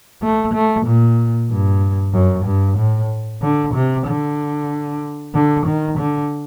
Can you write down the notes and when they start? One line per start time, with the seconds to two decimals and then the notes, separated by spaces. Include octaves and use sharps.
0.22 A3
0.54 A3
0.86 A#2
1.50 G2
2.13 F#2
2.45 G2
2.77 A2
3.42 D3
3.74 C3
4.07 D3
5.34 D3
5.66 D#3
5.98 D3